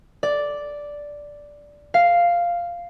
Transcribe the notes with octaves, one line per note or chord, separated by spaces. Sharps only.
D5
F5